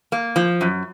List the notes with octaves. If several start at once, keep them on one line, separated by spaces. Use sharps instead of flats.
A#3
F3
F#2